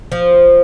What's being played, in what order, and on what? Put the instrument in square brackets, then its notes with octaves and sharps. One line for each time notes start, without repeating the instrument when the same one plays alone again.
[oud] F3